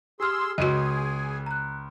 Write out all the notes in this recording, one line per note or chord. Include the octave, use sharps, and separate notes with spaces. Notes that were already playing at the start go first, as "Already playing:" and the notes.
G4 G#4 C6 E6 F6
C#2 F#4 G#4 D#5 G#5 D#7
A#5 F#6